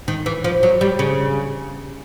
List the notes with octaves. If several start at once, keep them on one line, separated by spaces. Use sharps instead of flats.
D#3
E3
F3
F#3
G3
C#3